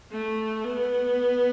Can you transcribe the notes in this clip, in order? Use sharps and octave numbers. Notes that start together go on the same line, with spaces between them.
A3
B3